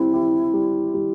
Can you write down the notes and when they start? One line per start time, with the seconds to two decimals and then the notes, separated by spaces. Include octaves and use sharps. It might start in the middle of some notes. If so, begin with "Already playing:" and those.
Already playing: G3 C4 E4
0.13 G4
0.54 G3
0.94 G3